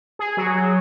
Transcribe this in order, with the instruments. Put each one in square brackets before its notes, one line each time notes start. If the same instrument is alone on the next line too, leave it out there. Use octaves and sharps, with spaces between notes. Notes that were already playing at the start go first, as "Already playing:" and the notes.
[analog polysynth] G#4
F#3
F#3